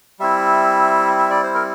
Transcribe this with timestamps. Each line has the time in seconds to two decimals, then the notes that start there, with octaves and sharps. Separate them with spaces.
0.19 G3 C4 E4 E5
1.19 E5
1.30 D5
1.43 C5
1.55 A#4